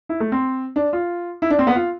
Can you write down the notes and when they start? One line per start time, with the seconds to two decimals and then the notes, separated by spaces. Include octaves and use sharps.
0.09 E4
0.20 A3
0.32 C4
0.76 D4
0.93 F4
1.42 E4
1.50 D4
1.59 C4
1.67 B3
1.75 F4